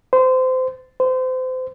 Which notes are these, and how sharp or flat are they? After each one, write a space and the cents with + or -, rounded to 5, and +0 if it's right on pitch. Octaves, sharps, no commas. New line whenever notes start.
C5 -25
C5 -30